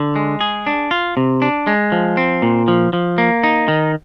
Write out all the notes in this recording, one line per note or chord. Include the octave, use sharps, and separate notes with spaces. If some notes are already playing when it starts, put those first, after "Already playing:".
Already playing: D3
G#3
G#4
D4
F4
C3
D4
G#3
F3
C4
A#2
F3
F3
A#3
D#4
D#3